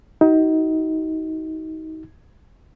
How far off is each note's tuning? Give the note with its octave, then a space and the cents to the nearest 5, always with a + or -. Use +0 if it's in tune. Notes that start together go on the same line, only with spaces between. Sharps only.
D#4 +30 F#4 +35